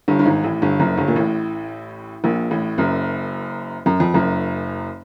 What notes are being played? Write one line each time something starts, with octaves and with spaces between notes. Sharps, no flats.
G1 G2
G2
G#1 G#2
A1 A2
G1 G2
F#1 F#2
G1 G2
A#2
A1 A2
A#1 A#2
A1 A2
F#1 F#2
F#2
F2
F#1 F#2